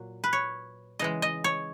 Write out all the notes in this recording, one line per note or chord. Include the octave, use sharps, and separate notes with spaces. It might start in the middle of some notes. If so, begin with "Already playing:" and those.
Already playing: A#2 F#3
B4
C#5
C#3 E3 G#3 D#5
D#5
C#5